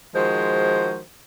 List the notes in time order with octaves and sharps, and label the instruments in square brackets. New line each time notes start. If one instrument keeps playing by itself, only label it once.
[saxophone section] D#3 F3 G#3 F#4 C5